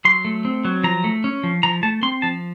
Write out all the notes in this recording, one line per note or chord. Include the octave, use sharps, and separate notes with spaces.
F#3 C6
A3
C4
F#3
F3 A#5
A3
C#4
F3
F3 A#5
A3 A5
C4 C6
F3 A5